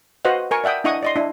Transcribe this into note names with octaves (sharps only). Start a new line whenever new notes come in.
F#4 B4 C5 D#5 F5 F#5
A#4 G#5 C#6
D5 E5 F#5 G5 D#6
D4 E4 D#5 F#5 C#6 D#6
D5 D#5 C6
D4 E4